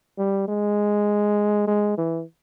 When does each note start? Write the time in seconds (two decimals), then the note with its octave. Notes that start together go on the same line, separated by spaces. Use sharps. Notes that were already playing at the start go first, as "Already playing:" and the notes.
0.18 G3
0.48 G#3
1.67 G#3
1.98 E3